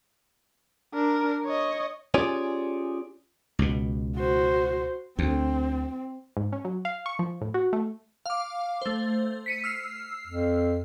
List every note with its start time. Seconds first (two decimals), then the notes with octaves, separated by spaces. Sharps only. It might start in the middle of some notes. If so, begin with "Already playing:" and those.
0.94 D4 A#4
1.46 C#5 D#5
2.14 C#4 F4 G4 G#4 C#5 D5
3.59 C#2 B2
4.16 F#4 C5
5.19 D2 C4
6.37 G#2
6.53 C#4
6.65 F#3
6.85 F5
7.06 C#6
7.19 F3
7.41 A2
7.54 F#4
7.73 A3
8.26 F5 D6
8.82 A3 C5
9.46 B6 C#7 D#7
9.64 E6 F6 C7
10.27 F2